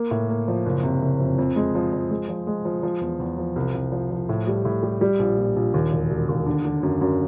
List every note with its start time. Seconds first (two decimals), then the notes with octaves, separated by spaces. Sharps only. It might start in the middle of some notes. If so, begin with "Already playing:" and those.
Already playing: A#3
0.11 A2
0.29 A#3
0.48 F3
0.66 F#1
0.83 C3
1.01 F#1
1.20 F2
1.38 F2
1.56 G#3
1.75 F3
1.93 F3
2.11 G#3
2.29 F3
2.47 G#3
2.65 F3
2.83 F3
3.01 E2
3.20 E2
3.38 F3
3.56 C2
3.74 C2
3.92 F3
4.11 F3
4.29 A2
4.47 G3
4.65 A2
4.83 G3
5.01 G3
5.19 A#1
5.38 A#2
5.56 A#1
5.74 D#2
5.92 E1
6.10 E1
6.29 D#2
6.46 D3
6.65 D3
6.83 F#2
7.01 F#2